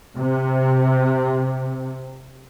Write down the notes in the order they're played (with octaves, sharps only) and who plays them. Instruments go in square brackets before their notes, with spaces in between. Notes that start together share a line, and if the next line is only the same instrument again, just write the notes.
[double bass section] C3